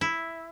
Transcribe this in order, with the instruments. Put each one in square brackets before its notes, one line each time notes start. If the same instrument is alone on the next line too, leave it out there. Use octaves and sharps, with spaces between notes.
[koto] E4